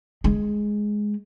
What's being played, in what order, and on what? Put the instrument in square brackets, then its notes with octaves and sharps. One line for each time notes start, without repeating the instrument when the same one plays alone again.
[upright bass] G#3